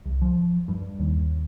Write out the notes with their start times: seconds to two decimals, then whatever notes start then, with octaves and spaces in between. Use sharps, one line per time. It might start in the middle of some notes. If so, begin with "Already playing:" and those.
0.05 C2
0.22 F3
0.68 G2
0.99 D#2